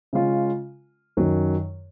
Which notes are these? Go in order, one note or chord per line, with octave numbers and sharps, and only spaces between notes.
C#3 G#3 C#4 F4
F#2 D#3 F#3